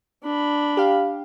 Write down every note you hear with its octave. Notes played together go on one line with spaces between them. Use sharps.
D4 B5
G4 F5